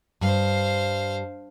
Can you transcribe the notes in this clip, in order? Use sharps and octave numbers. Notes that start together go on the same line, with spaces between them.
G2 C5 F5